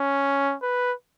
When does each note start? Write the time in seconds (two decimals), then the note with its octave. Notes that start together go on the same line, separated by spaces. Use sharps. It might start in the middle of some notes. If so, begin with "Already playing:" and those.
Already playing: C#4
0.62 B4